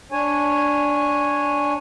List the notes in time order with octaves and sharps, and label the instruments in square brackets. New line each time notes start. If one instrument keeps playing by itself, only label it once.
[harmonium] D4 C#5 G#5